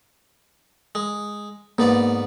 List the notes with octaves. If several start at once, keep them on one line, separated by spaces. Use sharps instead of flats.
G#3
G#2 A#3 B3 D5